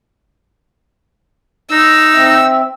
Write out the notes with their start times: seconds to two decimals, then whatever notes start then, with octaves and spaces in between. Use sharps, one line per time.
1.71 D#4 E6
2.14 C4 E5